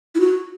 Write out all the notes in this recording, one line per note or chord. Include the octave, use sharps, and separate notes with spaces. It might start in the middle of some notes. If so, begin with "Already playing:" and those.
E4
F#4